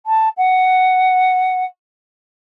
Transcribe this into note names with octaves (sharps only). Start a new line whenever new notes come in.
A5
F#5